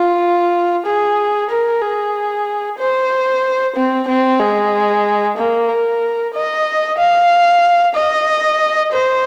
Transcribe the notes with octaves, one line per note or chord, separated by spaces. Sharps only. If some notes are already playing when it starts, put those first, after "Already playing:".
Already playing: F4
G#4
A#4
G#4
C5
C4
C4
G#3
A#3
A#4
D#5
F5
D#5
C5